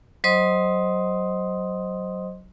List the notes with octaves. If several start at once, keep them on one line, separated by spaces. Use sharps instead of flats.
F#3 C5 D#5 C6 D#6